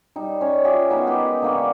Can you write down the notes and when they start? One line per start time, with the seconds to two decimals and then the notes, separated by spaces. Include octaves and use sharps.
0.16 G3 D#4
0.41 C#4 C#5
0.64 F4 G4 G#4 E5
0.90 B3 D#4 A#4 F#5
1.07 G#3 G4 B4 D#5
1.42 D3 A#3 C#6